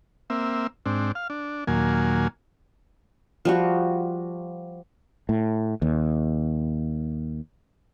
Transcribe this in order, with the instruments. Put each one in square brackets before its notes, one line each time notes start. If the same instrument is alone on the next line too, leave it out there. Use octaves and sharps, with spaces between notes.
[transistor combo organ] A#3 C4 E5
G#2 C4 D4
F5
D4
D#2 A#2 F#3 A#3 G#5
[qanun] F3 G3 F#4
[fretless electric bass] A2
D#2